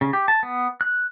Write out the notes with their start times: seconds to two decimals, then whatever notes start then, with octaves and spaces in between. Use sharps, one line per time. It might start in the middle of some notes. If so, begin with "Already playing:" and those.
0.01 C#3
0.13 G4
0.28 A5
0.43 B3
0.81 F#6